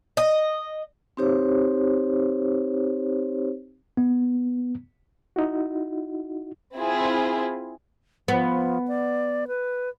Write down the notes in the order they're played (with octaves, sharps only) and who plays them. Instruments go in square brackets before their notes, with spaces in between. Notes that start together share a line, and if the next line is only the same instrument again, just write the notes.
[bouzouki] D#5
[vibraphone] C4 D#4 G4 C5 C#5
[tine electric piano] B3
[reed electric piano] D#4 E4 F#4
[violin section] C4 E4 F4 G#4
[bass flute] F3 [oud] B3
[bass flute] D5
B4